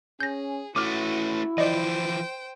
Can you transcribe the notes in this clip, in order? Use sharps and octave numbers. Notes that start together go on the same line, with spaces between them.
C#4 G#4 G6 A#6
A3 C#4 E4 F#4 D6 F6
E3 F3 C5 D5 D#5 G5